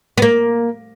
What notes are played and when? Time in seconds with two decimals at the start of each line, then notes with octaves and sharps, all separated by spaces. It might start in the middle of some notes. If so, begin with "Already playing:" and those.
0.18 B3
0.22 A#3